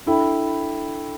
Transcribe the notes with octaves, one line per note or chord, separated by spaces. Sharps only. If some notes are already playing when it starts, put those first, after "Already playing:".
D4 E4 A4 G5 B5